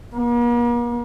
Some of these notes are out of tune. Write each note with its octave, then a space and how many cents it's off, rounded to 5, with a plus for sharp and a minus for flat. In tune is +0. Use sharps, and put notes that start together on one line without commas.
A#3 +45